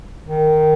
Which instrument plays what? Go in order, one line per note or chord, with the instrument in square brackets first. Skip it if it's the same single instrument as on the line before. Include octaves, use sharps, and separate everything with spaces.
[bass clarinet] D#3